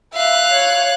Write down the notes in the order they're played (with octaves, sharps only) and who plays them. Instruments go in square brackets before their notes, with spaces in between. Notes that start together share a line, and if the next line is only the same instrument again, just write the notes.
[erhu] E5 [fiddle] F5 F#6
[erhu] C#5